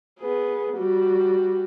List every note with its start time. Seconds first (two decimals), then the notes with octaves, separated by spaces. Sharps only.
0.20 B3 G#4
0.78 G3 F#4